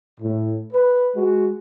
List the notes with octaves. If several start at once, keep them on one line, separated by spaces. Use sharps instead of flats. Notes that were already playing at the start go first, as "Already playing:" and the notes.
A2
B4
G#3 F#4